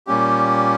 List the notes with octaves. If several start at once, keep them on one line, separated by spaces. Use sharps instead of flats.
A#2 G3 A#3 C#4 G4